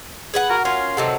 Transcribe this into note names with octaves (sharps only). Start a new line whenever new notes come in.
G#4 B4 F#5
F#4 A#4
C#4 F4 A#4 C6
C3 D#3 F#3 A4 C5 F#5